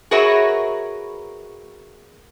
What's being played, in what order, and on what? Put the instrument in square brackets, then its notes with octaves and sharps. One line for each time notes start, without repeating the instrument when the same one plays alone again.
[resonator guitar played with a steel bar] F#4 G#4 A#4 B4 C#5 E5